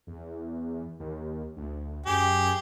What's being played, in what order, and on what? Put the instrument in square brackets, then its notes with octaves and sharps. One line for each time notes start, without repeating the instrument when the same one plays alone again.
[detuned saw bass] E2
D#2
D2
[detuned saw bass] F#2 [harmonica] G4 G#4